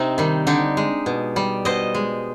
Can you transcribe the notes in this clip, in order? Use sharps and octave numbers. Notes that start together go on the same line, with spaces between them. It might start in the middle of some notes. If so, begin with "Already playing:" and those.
Already playing: C3 C4 D#4
D#3 G3
D3 D#4 G4
G#3
B2
G3
B2 C5 D#5
G#3